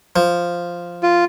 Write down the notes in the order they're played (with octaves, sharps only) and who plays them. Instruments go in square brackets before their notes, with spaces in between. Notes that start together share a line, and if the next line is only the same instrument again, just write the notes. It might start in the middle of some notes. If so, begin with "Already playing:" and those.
[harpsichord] F3
[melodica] F4